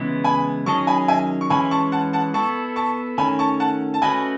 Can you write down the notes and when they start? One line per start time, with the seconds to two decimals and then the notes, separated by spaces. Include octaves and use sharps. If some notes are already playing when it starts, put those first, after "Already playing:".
Already playing: C#3 E3 G#3 B3 E4
0.24 G#5 B5
0.66 D#3 F#3 C#4 G#4 D#5 A5 C#6
0.87 G#5 B5
1.08 E5 G#5
1.41 C#6
1.50 E3 G#3 C#4 E4 G#5 B5
1.71 A5 C#6
1.92 F#5 A5
2.13 F#5 A5
2.34 B3 E4 A4 A5 C#6
2.76 A5 C#6
3.18 D#3 A3 C#4 G#5 B5
3.39 A5 C#6
3.60 F#5 A5
3.94 A5
4.02 A3 C#4 F#4 B4 D#5 G#5 B5